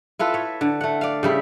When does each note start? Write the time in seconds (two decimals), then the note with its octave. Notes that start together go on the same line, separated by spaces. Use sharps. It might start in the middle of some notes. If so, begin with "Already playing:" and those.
0.19 E4 F4 A4 B4
0.34 C#5 E5
0.61 D3
0.81 A3 F#5
1.01 D5 F5
1.23 C#3 G3 E4